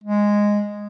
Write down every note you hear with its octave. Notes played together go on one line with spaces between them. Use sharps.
G#3